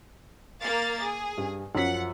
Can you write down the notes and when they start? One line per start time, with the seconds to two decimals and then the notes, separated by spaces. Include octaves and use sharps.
0.62 A#3 F5 A6
1.01 G#4
1.38 G2
1.75 F#2 F3 F#5 B6